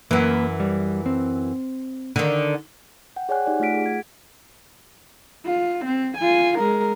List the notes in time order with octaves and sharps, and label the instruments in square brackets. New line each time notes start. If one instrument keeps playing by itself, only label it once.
[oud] F#2 E3 [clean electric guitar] A#3 B4
[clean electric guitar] G3
C4
[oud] D3 D#3
[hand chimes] F#5 G5
G#4 C#5 D5 F#5 G#5 F#6
D#4 G4 D5 G#5
A3 F4 F#5 F6 B6 D7
G#4
G#6
[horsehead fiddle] F4
C4
F4 G#5
G#3 A#4